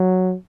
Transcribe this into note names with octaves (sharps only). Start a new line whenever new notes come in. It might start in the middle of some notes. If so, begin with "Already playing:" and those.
Already playing: F#3